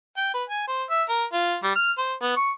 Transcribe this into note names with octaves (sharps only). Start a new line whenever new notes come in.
G5
B4
G#5
C5
E5
A#4
F4
G3
F6
C5
B3
C#6